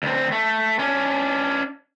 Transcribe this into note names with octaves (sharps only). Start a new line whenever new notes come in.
D2 C4
A3
C#4 D4